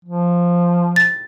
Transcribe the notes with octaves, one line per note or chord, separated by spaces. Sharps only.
F3
A6